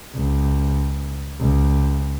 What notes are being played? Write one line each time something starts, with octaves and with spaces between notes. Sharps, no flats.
C#2
C#2